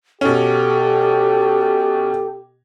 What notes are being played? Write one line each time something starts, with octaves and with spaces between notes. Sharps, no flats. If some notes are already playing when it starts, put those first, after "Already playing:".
B2 C#4 G4 A4